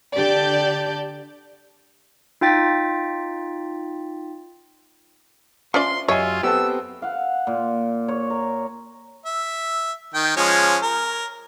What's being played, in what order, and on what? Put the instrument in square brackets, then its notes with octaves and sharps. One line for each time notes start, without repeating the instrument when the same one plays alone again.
[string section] D3 G4 D5 A5 G6
[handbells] D#4 F4 G5 A6 B6
[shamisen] C#4 F4 D5 [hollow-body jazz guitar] C5 E5 [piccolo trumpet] C6
[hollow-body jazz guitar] F#2 G4 D#5 [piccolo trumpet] F4 [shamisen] C#5 [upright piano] E5 G#5
[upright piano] B3 C4 A4 [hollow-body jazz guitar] G4 [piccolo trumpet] E6
[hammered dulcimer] F5 F#5
A#2
C#5
A#4
[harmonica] E5
D#3 G5
F3 G#3 C#4
A#4